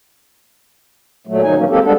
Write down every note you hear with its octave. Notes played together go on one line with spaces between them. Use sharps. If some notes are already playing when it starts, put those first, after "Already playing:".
A#2 F#3 A3
G#2 B2 D#3 F#3 D#4 G#5
D#3 E3 F#3 A#3 C#4
G#3 A#3 C4 G4 A4
G3 G#3 B3 D4 A4